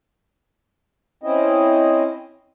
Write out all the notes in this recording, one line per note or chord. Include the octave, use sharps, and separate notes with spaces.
C4 C#4 E4 D#5